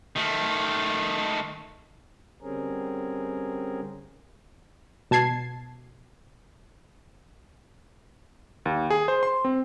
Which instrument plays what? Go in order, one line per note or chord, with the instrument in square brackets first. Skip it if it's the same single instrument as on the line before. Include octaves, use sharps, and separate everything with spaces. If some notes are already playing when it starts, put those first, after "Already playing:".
[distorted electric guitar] D#3 A3
[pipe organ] D3 G3 C4 C#4 G#4 A#4
[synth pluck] B2 A5 G#6 C7
[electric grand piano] D#2
G#4
C5
C6
C4